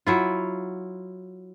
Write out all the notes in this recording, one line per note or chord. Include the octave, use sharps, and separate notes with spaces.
F#3 E4 F4